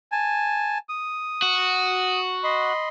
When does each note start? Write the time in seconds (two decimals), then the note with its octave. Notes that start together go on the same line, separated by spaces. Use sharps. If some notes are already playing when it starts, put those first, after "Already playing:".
0.12 G#5 A5
0.89 D#6
1.42 F#4
2.44 D#5 B5 C6